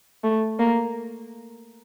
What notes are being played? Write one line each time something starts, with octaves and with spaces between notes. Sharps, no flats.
A3
A#3